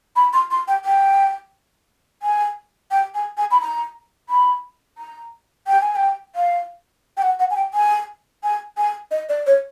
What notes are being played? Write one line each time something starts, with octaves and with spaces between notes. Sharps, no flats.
B5
C6
C6
G5
G5
G#5
G5
G#5
G#5
B5
A#5
B5
A#5
G5
G#5
G5
F5
G5
F#5
F#5
G#5
G5
G#5
G#5
G#5
D#5
D5
C#5